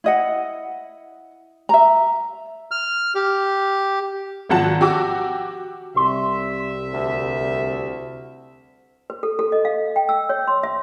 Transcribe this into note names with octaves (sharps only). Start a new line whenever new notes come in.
E4 D#5 F#5
E5 A#5
F6
G4
G#1 F3 F#3 F#5 A5
F#4 G4 D6 E6
C2 C3 E5 C6
D2
B4
A4
A4
D#5
F5
G5
E6
C#5
C6
E5